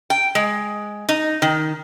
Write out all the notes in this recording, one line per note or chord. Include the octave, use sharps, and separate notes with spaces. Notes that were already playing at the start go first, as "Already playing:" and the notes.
G5
G#3
D#4
D#3